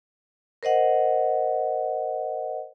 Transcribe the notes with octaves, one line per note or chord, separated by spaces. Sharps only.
A#4 C5 D#5 F#5